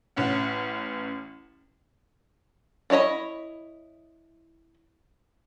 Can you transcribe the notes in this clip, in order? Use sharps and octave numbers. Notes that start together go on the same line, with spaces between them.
A1 C#4 F#5
D4 E4 C#5 D#5 B5